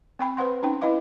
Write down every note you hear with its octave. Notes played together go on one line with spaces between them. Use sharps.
C4 G5 B5
B4 C5 F#5 C6
C#4 D#4 G5
E4 B4 D#5 F5 D6